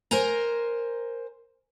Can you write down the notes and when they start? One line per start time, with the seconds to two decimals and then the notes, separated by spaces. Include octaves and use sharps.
0.11 A#4 C5 G#5 A#5